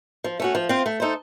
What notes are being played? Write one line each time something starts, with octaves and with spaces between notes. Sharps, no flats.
F3
A3 C#4 F#4
F3
C4 F4 C5
A3
D#4 A4 C5